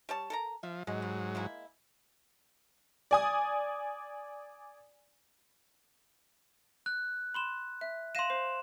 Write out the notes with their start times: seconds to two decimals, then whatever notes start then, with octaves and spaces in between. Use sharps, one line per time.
0.09 G3 C#5 A5
0.30 A4 A#4 A#5
0.63 F3 E5
0.87 G#2 F#3 G#3
1.02 G3
1.35 G#3 A#3 E4
3.11 D5 G#5 D#6
6.86 F#6
7.34 B5 C6 E7
7.81 E5
8.15 F5 C6 A#6 D#7 E7
8.30 C5 C7